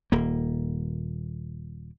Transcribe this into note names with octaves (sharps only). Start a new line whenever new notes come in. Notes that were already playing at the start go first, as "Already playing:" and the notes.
D#1 A#3